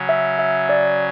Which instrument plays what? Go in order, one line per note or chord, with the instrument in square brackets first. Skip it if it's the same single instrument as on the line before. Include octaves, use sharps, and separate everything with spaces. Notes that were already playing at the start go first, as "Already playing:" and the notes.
Already playing: [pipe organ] C#3 F#3 C#4
[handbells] E5
E5
D5